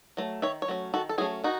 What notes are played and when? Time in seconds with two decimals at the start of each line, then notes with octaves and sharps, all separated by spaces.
0.17 F#3 A3
0.42 D#3 C#5 E5
0.62 C#5
0.68 F#3 A3 C#4
0.94 D#3 F#4 A4
1.09 A4
1.18 F#3 A3 C#4 E4 G#4
1.44 D#3 D#4 F#4